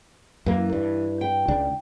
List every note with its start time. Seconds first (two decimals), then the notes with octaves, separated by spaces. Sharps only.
0.46 F#2 E3 A#3
0.73 G2
1.21 G5
1.48 C#2 D4